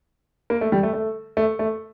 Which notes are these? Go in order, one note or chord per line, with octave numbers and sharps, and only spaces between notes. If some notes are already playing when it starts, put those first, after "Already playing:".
A#3
A3
G3
A3
A3
A3
A3